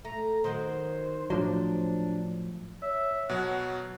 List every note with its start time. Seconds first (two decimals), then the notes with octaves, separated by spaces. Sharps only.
0.05 A3 A#5
0.44 D#3 F#3 D#4 C5
1.30 A2 F3 F#3 D4 C5
2.83 C#5 E5
3.29 B2 F#3 F#5